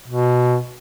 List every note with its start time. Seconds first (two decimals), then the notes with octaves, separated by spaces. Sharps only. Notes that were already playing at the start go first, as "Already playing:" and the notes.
0.08 B2